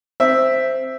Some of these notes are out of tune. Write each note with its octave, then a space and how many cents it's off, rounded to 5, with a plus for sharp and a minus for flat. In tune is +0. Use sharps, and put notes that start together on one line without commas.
C4 +0 E5 +0